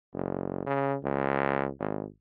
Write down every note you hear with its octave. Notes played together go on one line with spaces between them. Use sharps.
F#1
C#3
C#2
G#1